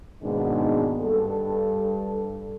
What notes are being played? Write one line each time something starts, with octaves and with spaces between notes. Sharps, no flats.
G#2 B2 D#3 G#3 A#3 D4
G2 A4